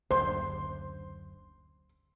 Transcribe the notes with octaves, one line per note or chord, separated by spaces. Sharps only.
F#1 D2 C5 C6